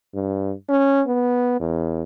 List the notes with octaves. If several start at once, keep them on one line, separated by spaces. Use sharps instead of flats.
G2
C#4
B3
E2